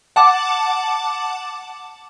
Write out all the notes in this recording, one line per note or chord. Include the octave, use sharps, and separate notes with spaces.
F#5 A5 D6